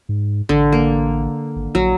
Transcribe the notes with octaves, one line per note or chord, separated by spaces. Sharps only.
G#2
A1 D3
A#3
G#1
A#1 F#3